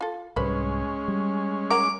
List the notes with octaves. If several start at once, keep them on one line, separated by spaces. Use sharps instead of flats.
F4 A4
C2 G#2 G3 G#3 C#4 B4 C5
G3
A#4 F#5 A#5 D6